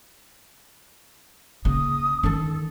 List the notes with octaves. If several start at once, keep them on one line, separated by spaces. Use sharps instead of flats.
C#3 A#3 D#6
D#3 C#4 A4